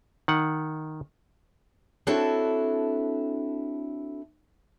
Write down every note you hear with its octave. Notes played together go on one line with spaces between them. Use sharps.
D#3 F#5
C4 D4 E4 F#4 A4 C#5